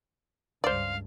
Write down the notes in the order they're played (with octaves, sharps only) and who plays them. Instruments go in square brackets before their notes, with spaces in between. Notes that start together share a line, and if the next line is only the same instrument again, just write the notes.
[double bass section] C#2 G2 [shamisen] C5 D5 [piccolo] F5